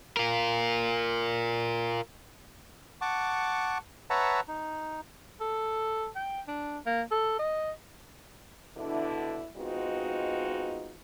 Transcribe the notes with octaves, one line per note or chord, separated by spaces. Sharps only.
F4 A#4
F#5 A5 C#6 D6
B4 C#5 E5 F#5 A5 A#5
D#4
A4
G5
D4
A#3
A4
D#5
B2 D3 D4 E4
G#3 B3 C4 D#4 F4 F#4